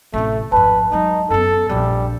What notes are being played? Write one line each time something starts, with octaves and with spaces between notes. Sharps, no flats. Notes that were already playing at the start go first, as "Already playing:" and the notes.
A1 C3 A3
G#1 F2 B4 A5
F#3 G#3 D#4
F#2 B3 A4
A#1 F2 G3